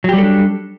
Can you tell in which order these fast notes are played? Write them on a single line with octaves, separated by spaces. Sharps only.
F#3 G4 G3 A4 D4